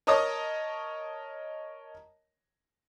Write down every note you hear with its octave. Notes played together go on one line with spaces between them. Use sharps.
A#4 C#5 D#5 A5 D#6